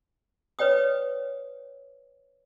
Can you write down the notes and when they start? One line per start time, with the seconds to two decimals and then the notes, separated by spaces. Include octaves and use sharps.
0.59 B4 C#5 D5 G5 D#6